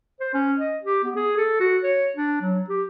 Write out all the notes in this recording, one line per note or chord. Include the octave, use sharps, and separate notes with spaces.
C5
C#4
D#5
G4
B3
G#4
A4
F#4
C#5
D4
F#3
G4